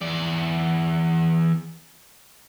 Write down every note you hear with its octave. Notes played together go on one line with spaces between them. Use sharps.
E2 D5